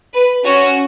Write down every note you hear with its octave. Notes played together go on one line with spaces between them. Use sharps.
B4
C#4 F#4 C#5